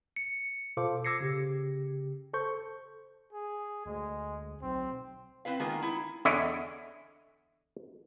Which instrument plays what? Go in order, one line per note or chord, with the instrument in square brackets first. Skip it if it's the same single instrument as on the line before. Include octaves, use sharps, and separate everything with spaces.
[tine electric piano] C#7
B2 F4 A4 C5 F5 D6
D6 E6 G#6 A#6 C7 C#7
C#3 G4
A4 C5 C#6 G6
[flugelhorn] G#4
[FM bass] D2 [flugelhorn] G#3
[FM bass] B1 [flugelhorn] C4
[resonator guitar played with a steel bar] C4 E4 B4 F5
D#3 G#3 A#3 B3 F4 A#4
D#4 E4
[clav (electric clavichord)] E2 D3 E4 C#5 D#5